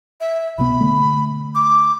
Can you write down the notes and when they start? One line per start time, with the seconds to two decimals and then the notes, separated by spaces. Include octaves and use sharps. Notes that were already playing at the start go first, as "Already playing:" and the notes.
0.20 E5
0.58 C2 B2 B3 B5
0.81 D3 A3
1.55 D6